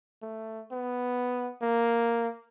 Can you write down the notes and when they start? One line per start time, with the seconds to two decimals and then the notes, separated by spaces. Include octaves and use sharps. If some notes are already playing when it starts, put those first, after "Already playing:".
0.22 A3
0.72 B3
1.62 A#3